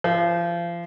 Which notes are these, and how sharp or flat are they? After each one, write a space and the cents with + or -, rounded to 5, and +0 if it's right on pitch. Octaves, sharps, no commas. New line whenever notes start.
F3 -30